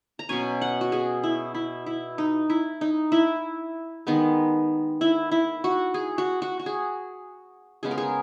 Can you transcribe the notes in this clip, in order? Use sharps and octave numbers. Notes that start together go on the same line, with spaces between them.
A#5
B2 F#3 C#4 G#5
F#5
F#4
G#4
E4
E4
E4
D#4
E4
D#4
E4
D#3 G#3 B3
E4
E4
F#4
G#4
F#4
F#4
F#4
G#4
C#3 G#3 B3 G#4
A#4
G#4